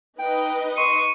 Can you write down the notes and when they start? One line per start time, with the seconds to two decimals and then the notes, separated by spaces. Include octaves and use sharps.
0.19 D#4 B4 D#5 G5
0.77 C6 C#6 D#7